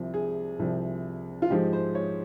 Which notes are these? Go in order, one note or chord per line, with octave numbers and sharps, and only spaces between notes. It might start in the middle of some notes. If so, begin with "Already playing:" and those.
Already playing: C2 C3 F3
G#4
C2 C3 F3
F4
G#2 F3 G#3 G4
C5
C#5